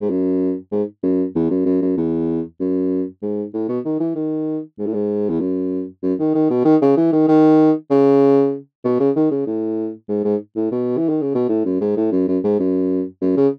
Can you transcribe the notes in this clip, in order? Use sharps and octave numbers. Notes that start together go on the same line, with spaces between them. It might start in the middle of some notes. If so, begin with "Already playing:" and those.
G#2
F#2
G#2
F#2
E2
F#2
F#2
F#2
E2
F#2
G#2
A2
B2
D#3
E3
D#3
G#2
A2
G#2
E2
F#2
F#2
D#3
D#3
B2
D#3
C#3
E3
D#3
D#3
C#3
B2
C#3
D#3
C#3
A2
G#2
G#2
A2
B2
E3
D#3
C#3
B2
A2
F#2
G#2
A2
F#2
F#2
G#2
F#2
F#2
C#3